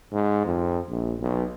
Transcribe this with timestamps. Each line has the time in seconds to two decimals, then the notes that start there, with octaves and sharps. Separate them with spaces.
0.12 G#2
0.46 F2
0.90 A#1
1.20 B1